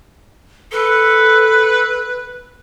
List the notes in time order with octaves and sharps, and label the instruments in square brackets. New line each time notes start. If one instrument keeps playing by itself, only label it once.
[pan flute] A4 [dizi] B4